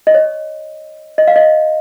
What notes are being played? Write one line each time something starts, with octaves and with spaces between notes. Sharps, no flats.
D#5
C#5
D#5
F5
D#5